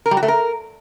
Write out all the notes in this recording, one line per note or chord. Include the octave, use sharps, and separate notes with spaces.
A#4
G3
F#4
A3
A#4